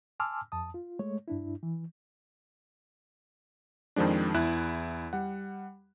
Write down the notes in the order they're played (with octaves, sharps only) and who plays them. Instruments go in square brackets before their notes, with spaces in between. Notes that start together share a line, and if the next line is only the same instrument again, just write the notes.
[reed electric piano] G#5 A5 C6 D6 E6 F6
F2 A5 D#6
F4
G#3 A3 C#5
G2 D4 E4
E3
[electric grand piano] F2 D#3 F3 G#3 D4
E2 E4 F#6
G3 F#5